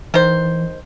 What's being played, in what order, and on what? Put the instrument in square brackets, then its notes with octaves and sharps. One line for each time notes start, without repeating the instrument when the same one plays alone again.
[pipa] D#3 C5 [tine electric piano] E3